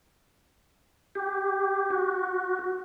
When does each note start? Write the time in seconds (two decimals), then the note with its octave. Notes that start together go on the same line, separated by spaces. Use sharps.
1.15 G4
1.91 F#4